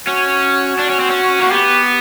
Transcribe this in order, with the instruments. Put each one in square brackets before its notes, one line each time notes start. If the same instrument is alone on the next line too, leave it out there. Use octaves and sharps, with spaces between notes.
[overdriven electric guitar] C#4 [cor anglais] F#4
[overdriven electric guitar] D4
C#4
C4
C#4
[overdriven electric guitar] A#3 [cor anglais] F#4
[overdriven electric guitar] B3 [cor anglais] G4